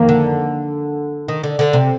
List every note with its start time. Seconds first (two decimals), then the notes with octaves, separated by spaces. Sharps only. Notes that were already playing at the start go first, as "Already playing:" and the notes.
Already playing: F2 D#3 A#3
0.09 D3
1.28 D#3
1.44 D3
1.59 D3
1.73 C3